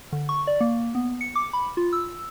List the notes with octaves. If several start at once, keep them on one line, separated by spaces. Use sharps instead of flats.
D3
C#6
D5
A#3
B3
C#7
D6
B5
F4
E6